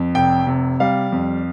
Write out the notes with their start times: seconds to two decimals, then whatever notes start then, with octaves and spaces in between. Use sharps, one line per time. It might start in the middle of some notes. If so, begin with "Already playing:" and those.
Already playing: F2
0.15 F1 G5
0.47 C3
0.80 G3 F5
1.12 F2